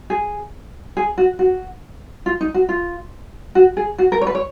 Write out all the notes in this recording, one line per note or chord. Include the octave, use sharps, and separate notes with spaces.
G#4
G#4
F#4
F#4
F4
D#4
F#4
F4
F#4
G#4
F#4
A#4
C#5
B4
C#5